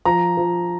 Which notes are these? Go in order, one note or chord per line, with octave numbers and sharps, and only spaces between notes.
F3 A#5
F3